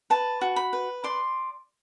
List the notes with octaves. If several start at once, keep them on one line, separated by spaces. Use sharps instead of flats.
B4 A5
F#4
B5
B4
D5 C6